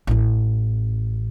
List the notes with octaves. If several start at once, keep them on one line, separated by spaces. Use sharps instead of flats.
A1 C#4